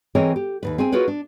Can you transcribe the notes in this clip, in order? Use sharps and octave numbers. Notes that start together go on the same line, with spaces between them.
E3 C4 G#4 A#4 C#5 D#5
G4
D#2 D#3 B4
C4 G#4 E5 G#5
F4 F#4 G#4 A#4 B4 C#5
D4